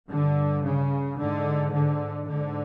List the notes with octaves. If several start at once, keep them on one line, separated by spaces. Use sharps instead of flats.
G2 D3
C#3
G#2 D3
D3
G#2 D3